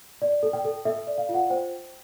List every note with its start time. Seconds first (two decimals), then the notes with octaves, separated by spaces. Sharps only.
0.22 D5
0.43 A4
0.53 G5
0.64 A4
0.85 A4 E5
1.07 D5
1.18 F5
1.29 F4
1.34 F#5
1.50 C5 G5